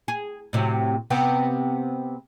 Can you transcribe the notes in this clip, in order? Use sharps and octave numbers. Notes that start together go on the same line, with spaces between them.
G#4
A2 C3 F#3
C3 B3 G4